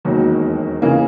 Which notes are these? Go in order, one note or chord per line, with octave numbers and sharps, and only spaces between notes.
E1 D#2 D#3 F#3
C#3 E3 A#3